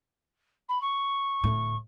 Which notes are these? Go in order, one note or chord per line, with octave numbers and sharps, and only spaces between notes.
B5
C#6
D1 A2